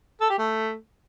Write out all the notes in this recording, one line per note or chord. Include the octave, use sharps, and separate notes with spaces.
A4
G4
A3